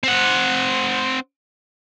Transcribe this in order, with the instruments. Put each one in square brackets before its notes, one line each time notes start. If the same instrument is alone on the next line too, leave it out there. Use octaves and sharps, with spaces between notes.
[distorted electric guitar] C4 F#5